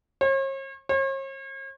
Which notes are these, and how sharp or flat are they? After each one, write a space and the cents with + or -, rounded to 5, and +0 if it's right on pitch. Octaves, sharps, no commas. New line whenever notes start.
C#5 -45
C#5 -45